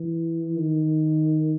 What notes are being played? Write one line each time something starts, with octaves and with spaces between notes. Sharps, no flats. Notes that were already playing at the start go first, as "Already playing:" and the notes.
Already playing: E3
D#3